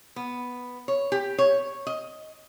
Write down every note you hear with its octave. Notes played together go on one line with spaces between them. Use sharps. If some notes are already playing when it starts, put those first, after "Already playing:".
B3
C#5
G4
C#5
D#5